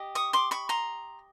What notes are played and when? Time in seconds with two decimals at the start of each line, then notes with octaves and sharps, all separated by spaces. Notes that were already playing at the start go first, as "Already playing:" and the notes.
Already playing: G4 D#5
0.15 C#6 D#6
0.33 C6 D6
0.51 B5 C#6
0.69 A#5 C6